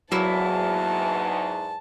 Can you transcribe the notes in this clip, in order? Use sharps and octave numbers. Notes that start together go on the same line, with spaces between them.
E2 G#2 F#3 A#3 E4 A5